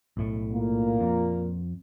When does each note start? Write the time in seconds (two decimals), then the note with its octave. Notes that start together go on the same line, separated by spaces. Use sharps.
0.17 B1 A2
0.53 A#2 A#3
1.00 F2